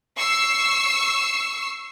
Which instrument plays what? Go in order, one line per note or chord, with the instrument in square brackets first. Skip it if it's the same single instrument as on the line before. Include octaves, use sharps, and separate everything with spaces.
[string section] C#6 E6 C7